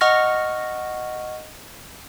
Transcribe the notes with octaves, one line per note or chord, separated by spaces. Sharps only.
D#5 F#5 C#6 F6 A#6